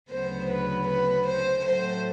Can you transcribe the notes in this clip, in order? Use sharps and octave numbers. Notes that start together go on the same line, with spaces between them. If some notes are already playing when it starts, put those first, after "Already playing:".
D2 C#3 F#3 B3 C5
B4
B4
C5
A2 F#3 A3 C5